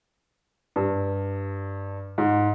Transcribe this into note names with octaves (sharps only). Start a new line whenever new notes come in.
G2
G#2